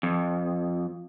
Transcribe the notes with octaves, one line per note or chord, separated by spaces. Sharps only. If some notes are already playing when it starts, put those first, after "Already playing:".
F2